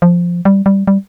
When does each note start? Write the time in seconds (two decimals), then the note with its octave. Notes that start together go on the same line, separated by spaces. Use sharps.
0.02 F3
0.45 G3
0.66 G3
0.87 G3